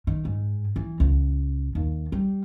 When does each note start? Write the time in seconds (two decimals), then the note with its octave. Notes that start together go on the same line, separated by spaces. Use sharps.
0.07 D#3
0.25 G#2
0.76 E3
1.00 C#2
1.75 D#2
2.12 G3